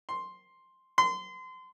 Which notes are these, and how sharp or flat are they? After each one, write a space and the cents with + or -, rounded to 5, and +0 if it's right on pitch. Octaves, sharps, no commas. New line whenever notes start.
C6 +5
C6 -30